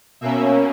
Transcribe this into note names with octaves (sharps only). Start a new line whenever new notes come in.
B2 A#3 C#4 E5